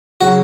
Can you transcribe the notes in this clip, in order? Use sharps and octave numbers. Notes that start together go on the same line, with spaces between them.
C#3 F#3 C#4 F#4